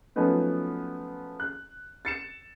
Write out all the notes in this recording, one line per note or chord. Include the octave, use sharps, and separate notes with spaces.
F3 F#3 A3 B3 C#4 D#4
F#6
A6 C#7 E7